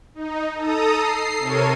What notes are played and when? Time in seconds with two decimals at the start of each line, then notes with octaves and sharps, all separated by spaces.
0.15 D#4
0.55 A4 A#5 D#6
0.95 C7
1.39 C3 A4 A#4 C#5 D#7